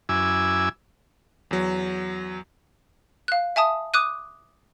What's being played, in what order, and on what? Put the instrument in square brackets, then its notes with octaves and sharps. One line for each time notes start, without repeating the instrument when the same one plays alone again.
[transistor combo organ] F#2 E4 G#5 D6 E6
[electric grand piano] E2 F#3
[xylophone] F5 F#6
E5 G#5 A5 D#6
D6 D#6 F#6 D#7